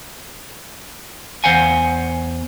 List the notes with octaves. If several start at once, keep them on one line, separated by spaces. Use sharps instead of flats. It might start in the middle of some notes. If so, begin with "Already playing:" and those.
E2 C5 F5 F#5 G#5